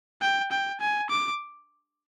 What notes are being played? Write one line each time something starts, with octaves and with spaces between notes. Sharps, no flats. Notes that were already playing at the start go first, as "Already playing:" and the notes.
G5
G5
G#5
D6